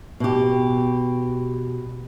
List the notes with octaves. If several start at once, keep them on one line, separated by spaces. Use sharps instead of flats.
B2 G4